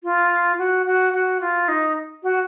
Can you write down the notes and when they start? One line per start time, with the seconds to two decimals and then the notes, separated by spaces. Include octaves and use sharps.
0.03 F4
0.58 F#4
0.86 F#4
1.13 F#4
1.40 F4
1.68 D#4
2.23 F#4